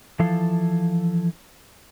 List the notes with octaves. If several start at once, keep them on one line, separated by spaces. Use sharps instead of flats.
E3 F3 E4 A4 F5